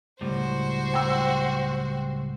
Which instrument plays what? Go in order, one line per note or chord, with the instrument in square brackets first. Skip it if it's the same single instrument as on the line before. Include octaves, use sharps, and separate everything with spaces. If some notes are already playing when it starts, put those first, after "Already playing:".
[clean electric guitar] C#2 A2 G3 [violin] F#4 C5
[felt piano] G5 E6